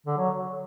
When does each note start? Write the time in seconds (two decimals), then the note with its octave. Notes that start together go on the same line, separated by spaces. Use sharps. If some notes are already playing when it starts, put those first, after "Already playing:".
0.06 D3
0.17 F#3